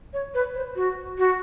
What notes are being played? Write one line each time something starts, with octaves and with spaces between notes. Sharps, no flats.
C#5
B4
C5
F#4
F#4